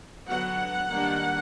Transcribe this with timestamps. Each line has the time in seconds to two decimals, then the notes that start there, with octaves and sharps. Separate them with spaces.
0.28 D3 F#3 B3 F#5
0.89 D#3 G3 A#3 D4